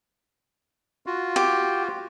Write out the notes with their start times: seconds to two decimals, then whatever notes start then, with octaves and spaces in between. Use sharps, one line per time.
1.06 F4 F#4
1.36 G4